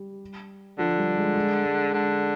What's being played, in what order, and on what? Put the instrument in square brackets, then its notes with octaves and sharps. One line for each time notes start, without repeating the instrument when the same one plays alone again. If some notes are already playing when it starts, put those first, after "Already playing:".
Already playing: [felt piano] G3
[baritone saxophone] D3 [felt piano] F3
[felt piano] G3
G#3
G#3
G#3
[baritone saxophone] D3 [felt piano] G#3